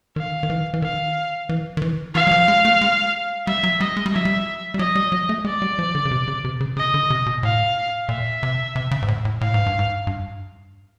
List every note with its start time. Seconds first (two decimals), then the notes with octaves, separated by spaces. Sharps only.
0.16 D#3 F5
0.43 D#3
0.50 E3
0.74 E3
0.82 D#3 F5
1.49 E3
1.77 D#3
1.82 E3
2.14 E3 F5
2.27 F#3
2.31 F3
2.48 G#3
2.65 A3
2.81 G#3
3.47 G3 E5
3.63 F#3
3.81 G3 D#5
3.97 G#3
4.06 G3
4.13 F#3 E5
4.25 G3
4.74 G3
4.79 F#3 D#5
4.95 G3
5.12 F#3
5.29 A3
5.45 G#3 D5
5.62 G3
5.79 F3
5.95 D3
6.05 C#3
6.11 C3
6.28 C#3
6.44 C3
6.60 C#3
6.77 C#3 D#5
6.94 D3
7.10 C3
7.26 B2
7.43 A2 F5
8.09 A#2 E5
8.43 C3
8.76 C3
8.91 C#3
9.02 G#2
9.08 A2
9.25 A2
9.41 A2 F5
9.54 G#2
9.66 G2
9.79 G#2
10.07 G2